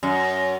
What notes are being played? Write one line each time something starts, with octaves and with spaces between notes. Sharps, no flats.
F#2